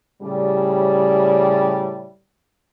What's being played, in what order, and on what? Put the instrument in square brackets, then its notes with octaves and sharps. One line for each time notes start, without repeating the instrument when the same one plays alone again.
[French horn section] A2 C#3 G3